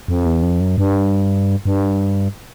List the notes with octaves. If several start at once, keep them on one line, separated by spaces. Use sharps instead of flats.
F2
E2
F2
F#2
G2
G2